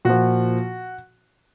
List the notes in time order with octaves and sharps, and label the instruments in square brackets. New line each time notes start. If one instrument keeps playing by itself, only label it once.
[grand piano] A#2 F3 F#4